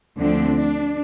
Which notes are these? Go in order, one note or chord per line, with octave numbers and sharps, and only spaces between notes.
D2 D3 F3 A3 C4 D4
D4